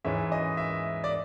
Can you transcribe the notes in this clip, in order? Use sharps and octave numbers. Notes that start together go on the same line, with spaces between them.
G#2 E3 G#3 C#4 E5
D#5
E5
D5